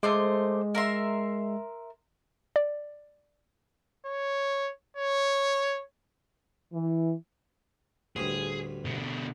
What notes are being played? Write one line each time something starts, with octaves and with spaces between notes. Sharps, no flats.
G#3 A3 C5 D6
A#4 E5 C6
D5
C#5
C#5
E3
A1 D2 G2 G#4
B2 D3